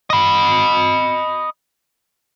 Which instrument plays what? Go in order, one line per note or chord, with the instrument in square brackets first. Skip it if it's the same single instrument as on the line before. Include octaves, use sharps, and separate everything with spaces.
[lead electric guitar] D#5 B5